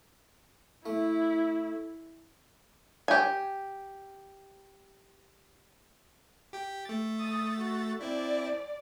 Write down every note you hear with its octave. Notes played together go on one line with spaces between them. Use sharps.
A3 E4
G4 G#5
G4 G5
A3 A6
D#6
F#4
C4 E4 D5